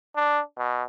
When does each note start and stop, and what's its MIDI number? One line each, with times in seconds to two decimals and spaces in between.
0.16 0.41 62
0.57 0.83 47